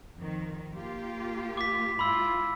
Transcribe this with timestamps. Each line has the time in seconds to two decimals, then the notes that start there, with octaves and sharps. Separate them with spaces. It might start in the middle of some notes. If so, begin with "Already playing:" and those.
0.16 F2 D#3
0.73 A#3 F4 G4
1.57 D6 B6
1.99 G#2 E4 F4 B5 C6 E6